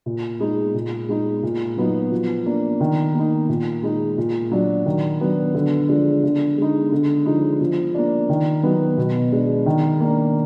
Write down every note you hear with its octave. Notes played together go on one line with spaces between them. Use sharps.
A#2
G#3 D#4
A#2
G#3 D#4
A#2
F#3 B3 D#4
F3
A#3 D4
D#3
A#3 D#4
A#2
G#3 D#4
A#2
F#3 D4
D#3
F#3 B3 D4
D3
F3 G#3 D4
D3
G#3 D#4
D3
F3 G#3 D#4
F3
A#3 D4
D#3
F#3 B3 D#4
B2
G#3 D4
D#3
A#3 D4